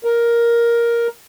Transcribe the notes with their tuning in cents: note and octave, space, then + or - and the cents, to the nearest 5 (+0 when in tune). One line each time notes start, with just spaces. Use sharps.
A#4 +10